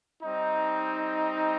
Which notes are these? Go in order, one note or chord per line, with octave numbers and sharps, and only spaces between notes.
G3 C4 D#4